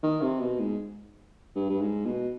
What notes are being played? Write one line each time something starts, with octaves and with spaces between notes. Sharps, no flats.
D#3
C3
B2
G#2
G2
G2
G#2
B2